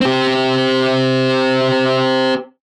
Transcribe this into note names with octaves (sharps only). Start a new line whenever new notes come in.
C4 G4